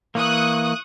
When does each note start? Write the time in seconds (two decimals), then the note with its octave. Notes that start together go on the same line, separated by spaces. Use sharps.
0.15 E3 A#3 C#6 D#6 F#6